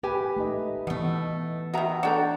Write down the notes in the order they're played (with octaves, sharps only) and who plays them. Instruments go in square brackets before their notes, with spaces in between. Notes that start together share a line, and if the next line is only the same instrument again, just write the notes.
[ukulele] G4 G#5 [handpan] B4
[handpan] A3 D#4 D#5
[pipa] B2 A3 [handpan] E3 B3
[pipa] B2 D#3 [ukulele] F#4 E5 A#5
[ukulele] D4 A4 A#5 [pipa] F#4 G5